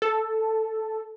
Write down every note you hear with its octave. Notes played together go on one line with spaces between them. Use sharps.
A4